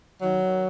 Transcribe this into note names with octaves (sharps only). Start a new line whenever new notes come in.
D#3 F#3
D#3